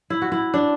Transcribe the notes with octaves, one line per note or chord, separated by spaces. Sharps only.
E4
F#4
E4
D4